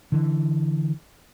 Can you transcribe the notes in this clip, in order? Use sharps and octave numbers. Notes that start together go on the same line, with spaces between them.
D3 E3